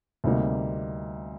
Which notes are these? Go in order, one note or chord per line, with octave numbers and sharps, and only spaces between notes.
D2 C3 G3 A#3 D#4